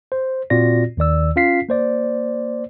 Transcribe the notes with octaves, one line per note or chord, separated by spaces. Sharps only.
C5
A#2 C4 F4 F#4 D5 A#6
D#2 D#3 D5 E6
C#4 F4 F5 B6 C7
A#3 C5 D5